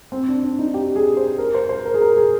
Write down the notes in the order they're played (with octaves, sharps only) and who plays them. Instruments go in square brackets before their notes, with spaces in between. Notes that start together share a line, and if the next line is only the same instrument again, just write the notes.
[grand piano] C4
D4
D4
D#4
G4
G#4
C5
A#4
C5
C5
A#4
G#4
A#4
G#4